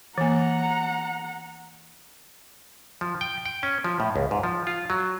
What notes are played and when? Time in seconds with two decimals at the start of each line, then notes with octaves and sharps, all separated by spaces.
0.18 E3 A#3 F#5 A#5
3.01 F3
3.21 G5
3.46 G5
3.63 C#4
3.84 F3
4.00 A2
4.16 C#2
4.31 G#2
4.43 F3
4.67 F4
4.90 F#3